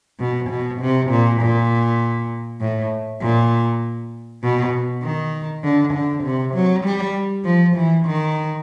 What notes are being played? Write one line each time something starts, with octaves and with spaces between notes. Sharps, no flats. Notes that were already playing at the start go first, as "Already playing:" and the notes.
B2
B2
C3
A#2
A#2
A2
A#2
B2
D#3
D3
D3
C3
F#3
G3
F3
E3
D#3